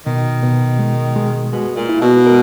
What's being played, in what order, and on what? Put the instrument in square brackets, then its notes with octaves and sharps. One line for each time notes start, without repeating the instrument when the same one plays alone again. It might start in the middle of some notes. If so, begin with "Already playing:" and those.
[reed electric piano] B2 [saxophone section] D#3
[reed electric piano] B2
G#3
G#3
[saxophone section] B2 [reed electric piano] G#3
[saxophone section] A#2
[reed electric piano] E4
[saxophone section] B2
[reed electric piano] A#4